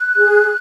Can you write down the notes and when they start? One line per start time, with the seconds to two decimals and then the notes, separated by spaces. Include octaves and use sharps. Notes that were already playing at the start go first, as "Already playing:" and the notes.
Already playing: F#6
0.17 G#4